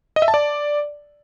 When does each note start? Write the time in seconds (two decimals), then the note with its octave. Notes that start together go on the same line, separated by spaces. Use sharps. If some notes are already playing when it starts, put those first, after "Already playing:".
0.16 D#5
0.22 E5
0.28 A5
0.34 D5